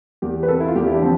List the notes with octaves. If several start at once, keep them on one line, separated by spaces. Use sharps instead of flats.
E2 G4
B4
C3 A4
E4
F4
E2 G4
E4
D4
F3 C4